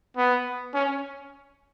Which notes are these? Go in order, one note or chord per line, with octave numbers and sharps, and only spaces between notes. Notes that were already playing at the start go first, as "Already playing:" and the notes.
B3
C#4